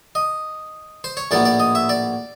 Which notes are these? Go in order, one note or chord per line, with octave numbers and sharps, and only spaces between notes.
D#5
C5
C#5
A#1 A2 F#3 B3 D5
D5
D#5
E5
D5